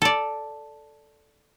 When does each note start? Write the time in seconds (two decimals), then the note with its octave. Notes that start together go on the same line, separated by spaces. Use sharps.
0.02 A4 D5